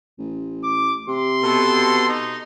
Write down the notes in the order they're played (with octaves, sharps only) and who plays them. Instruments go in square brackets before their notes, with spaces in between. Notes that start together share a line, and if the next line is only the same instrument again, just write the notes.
[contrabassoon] A1
[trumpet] D6
[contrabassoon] C3 [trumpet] C6
[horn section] B2 A4
[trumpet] D#4